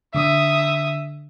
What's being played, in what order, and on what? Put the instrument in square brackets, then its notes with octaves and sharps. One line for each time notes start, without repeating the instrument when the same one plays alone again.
[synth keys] D3 [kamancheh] E5 D#6